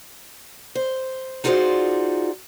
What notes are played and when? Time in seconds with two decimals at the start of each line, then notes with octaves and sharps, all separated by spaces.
0.75 C5
1.44 D#4 F4 F#4 G#4 C5 D5